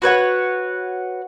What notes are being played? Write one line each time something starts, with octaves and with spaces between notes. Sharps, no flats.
F#4 B4 C#5 F#5